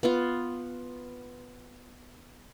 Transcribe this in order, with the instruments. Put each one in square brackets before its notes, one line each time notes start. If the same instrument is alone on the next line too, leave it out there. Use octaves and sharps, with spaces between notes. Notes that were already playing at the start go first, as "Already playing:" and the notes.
[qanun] B3 F4